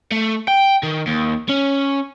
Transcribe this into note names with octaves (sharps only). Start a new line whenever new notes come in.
A3
G5
D#3
D#2
C#4